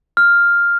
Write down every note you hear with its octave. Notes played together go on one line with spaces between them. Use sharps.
F6